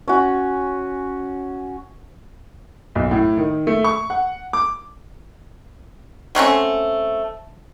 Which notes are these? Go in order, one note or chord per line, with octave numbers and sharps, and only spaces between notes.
C#4 F#4
B1
A2
D#3
A3
C#6
F#5
D6
F#3 A3 C4 C#4